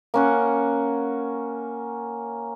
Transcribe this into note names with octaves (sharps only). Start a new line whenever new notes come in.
A#3 C#4 F#5